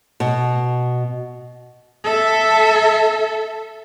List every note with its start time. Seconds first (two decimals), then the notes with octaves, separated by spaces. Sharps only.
0.20 B2
2.04 A4 E5